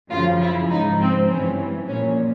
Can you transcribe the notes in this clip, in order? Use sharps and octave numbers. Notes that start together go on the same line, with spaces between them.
F#2 C#3 F3 F4
E4
G#2 F3 D#4
C4
G2 E3 C#4
A#2 F3 C#4